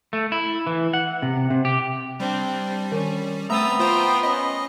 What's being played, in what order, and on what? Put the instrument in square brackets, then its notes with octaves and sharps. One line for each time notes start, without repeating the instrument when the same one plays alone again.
[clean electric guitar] A3
E4
E3
F#5
C3
C3
G4
[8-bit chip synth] G3 [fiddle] C4 D4
[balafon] D#3 [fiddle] C#4
[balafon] A3 [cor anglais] B3 [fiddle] C4 D#6 [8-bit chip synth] A#5 E6 A6
[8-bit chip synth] F4 C5 G5 [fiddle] A#5 C6
[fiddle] C#4 [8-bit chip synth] D#5